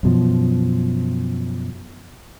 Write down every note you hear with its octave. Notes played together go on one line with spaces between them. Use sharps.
F#2 B2 F3